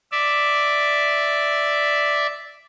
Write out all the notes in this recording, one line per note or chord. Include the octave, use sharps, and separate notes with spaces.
D5 E5